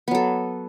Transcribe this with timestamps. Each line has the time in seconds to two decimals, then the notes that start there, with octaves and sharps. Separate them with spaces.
0.08 B3
0.11 F#3
0.15 A4